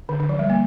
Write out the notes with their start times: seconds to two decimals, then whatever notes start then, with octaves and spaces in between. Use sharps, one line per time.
0.09 D3
0.20 D3
0.29 F3
0.39 G3
0.50 A#3